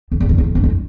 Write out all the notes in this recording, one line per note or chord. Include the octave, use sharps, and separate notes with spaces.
F2
E2
F2
E2
F2
G2
F2